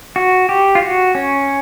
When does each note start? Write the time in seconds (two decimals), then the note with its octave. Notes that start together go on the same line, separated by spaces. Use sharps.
0.16 F#4
0.49 G4
0.75 F4
0.82 F#4
1.15 C#4